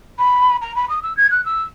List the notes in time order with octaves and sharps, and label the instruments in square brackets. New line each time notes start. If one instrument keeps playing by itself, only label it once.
[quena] B5
A#5
B5
D#6
E6
G#6
F#6
E6